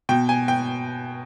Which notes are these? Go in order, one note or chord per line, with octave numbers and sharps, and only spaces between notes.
B2 G5
G#5
G5